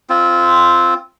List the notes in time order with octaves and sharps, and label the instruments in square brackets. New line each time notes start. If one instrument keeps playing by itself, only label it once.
[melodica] C4 F4